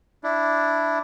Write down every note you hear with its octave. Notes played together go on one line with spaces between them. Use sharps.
D4 E4